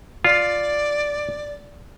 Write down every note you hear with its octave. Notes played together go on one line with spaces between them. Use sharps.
F4 D5